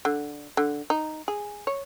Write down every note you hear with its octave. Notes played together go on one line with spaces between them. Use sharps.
D3
D3
D#4
G#4
C#5